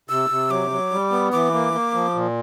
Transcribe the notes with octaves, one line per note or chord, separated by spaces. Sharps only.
C3 E6
C3
F#3 D6
F#3
G3
B3
E3 D6
A#3
A#3
F3
A#2